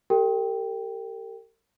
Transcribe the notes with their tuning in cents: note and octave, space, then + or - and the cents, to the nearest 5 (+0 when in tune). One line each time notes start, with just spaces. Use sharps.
G4 +0 A#4 -45 G5 +0